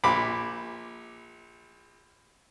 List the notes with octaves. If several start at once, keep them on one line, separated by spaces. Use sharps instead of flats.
A#1 B5 D6